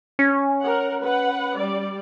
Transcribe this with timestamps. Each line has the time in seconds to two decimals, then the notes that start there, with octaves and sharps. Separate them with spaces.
0.19 C#4
0.61 A#4 F#5
1.01 B4 F#5
1.57 G3 D5